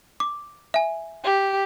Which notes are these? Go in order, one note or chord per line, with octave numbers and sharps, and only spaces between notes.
D6
E5 G#5
G4